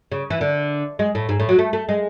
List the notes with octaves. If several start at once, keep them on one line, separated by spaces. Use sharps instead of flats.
C#3
E3
D3
G#3
A2
G#2
A2
F#3
A3
A3
G#3